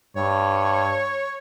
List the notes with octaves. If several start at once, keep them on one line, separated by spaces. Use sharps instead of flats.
G2 C#5